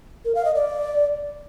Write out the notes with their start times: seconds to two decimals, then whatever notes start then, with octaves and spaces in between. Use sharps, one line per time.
0.25 A#4
0.35 F5
0.45 D#5
0.55 D5